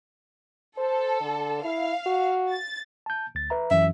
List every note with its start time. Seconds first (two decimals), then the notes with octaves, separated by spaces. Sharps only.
0.78 A4 C5
1.21 D3
1.64 E4 F5
2.06 F#4
2.50 A6
3.06 A5 G6
3.35 D2 A6
3.50 B4 E5 A#5
3.71 F#2 E3 E5